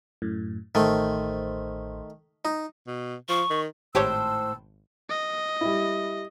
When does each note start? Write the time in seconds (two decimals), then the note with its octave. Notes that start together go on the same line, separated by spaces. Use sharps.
0.22 F#2 A2
0.75 A1 D#3 A3 C5
2.45 D#4
2.87 B2
3.29 F3 C#6
3.50 D#3
3.95 G#1 A2 G4 C5 C#5 E6
5.10 D#5
5.61 G3 E4